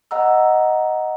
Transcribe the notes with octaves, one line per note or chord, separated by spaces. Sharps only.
D#5 F#5 A#5 E6